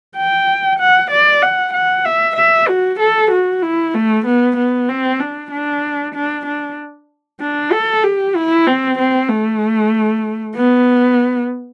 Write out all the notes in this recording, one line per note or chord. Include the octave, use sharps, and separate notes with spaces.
G5
F#5
D5
F#5
F#5
E5
E5
F#4
A4
F#4
E4
A3
B3
B3
C4
D4
D4
D4
D4
D4
A4
G4
E4
C4
C4
A3
B3